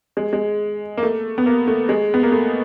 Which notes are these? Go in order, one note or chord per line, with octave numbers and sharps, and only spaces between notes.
G#3
G#3
A#3
A3
B3
A#3
A3
G#3
B3
A#3
A3